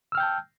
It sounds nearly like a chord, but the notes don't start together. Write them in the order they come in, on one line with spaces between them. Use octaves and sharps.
E6 F6 G5 G6 A5